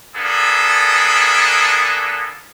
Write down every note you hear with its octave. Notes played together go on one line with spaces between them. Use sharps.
A#3 B3 D4 G#4 A4